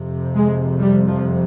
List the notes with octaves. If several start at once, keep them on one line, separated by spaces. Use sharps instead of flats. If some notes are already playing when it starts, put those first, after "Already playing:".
Already playing: F2 C3
G#3
G3
F3